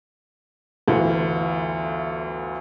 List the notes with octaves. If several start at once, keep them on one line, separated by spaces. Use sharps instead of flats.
G1 D2 E3